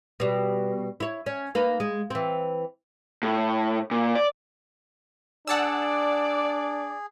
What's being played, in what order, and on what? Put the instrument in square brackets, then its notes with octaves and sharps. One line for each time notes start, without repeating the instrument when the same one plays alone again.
[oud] B2 G3
E4 C#5
C#4
A#3 D#4 B4
G#3
E3 C4
[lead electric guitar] A2
A#2
D5
[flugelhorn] D4 [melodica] G#4 [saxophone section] D5 [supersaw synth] F#5 A5 E6